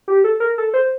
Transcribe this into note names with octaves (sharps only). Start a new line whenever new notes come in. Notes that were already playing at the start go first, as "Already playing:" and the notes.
G4
A4
A#4
A4
C5